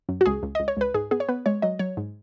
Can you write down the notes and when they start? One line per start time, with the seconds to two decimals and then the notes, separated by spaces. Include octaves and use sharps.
0.09 F#2
0.21 F#4
0.26 C#2 G#4
0.43 C#2
0.55 C#2 D#5
0.68 C#5
0.77 C#2 B4
0.94 G#2 G#4
1.11 B3 G#4
1.20 C#5
1.29 B3 B4
1.46 G#3 C#5
1.62 F#3 D#5
1.79 F#3 C#5
1.97 G#2